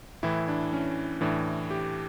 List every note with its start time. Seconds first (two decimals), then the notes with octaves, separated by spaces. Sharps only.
0.23 A2 E3 E4
0.48 D4
0.73 C#4
1.21 A2 E3 D4
1.71 G4